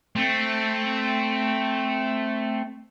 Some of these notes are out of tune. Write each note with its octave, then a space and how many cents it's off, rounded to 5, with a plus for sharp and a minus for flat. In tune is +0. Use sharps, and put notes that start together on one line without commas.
A3 +0 C4 +0